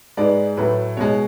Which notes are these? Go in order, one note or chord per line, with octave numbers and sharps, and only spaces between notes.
G#2 G#3 B4 D5
A2 F#3 A3 B4
B2 G#3 C#5